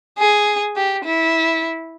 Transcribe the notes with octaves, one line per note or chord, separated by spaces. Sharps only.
G#4
G4
E4